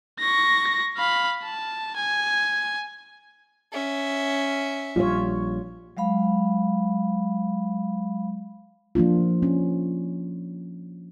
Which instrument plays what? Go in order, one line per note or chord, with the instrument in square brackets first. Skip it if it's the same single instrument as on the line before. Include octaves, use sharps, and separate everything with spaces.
[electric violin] C#6 A#6
F5 B5
A5
G#5
[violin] C#4 E5
[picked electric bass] A#1 G3 [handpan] F4 C#5
[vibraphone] F#3 G#3 F5 B5
[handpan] F3 A#3 D4 F4
C#4